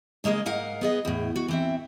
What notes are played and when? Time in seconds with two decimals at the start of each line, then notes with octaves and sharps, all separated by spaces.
0.24 C#3 G#3 A#3 G#4 D#5
0.46 G#2 A#4 F5 F#5
0.81 B3 G#4 D#5
1.05 E2 A2
1.36 F#4
1.48 E3 C4 E5